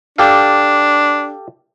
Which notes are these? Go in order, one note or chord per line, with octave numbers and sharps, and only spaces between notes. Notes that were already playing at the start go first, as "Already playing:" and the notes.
D4 G4 A4 F5